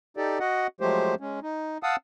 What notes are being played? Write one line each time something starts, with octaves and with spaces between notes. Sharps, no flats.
D#4 G4 A4 D5
F#4 D#5 F#5
F3 F#3 G#3 A3 G4 C5
G#3 C#4
D#4
F5 F#5 A5 D#6 E6